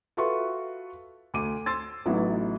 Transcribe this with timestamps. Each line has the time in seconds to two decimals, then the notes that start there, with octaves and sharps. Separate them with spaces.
0.17 F4 F#4 A4 B4 E5 C#6
1.34 D2 D6 D#7
1.66 C6 E6 A6
2.06 A1 F#3 B3 D#4 E4